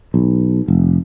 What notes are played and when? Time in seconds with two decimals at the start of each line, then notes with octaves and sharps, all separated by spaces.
0.14 B1
0.68 F1